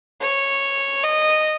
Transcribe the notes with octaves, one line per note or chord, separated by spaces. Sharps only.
C#5
D#5